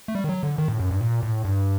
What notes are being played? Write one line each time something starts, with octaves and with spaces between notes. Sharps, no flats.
A3
G3
D#3
F#3
D3
D#3
A2
F#2
G2
A#2
A2
G2